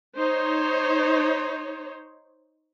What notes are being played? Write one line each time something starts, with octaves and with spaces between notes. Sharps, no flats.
D#4 C5 C#5